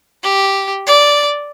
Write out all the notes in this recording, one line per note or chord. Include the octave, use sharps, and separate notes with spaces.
G4
D5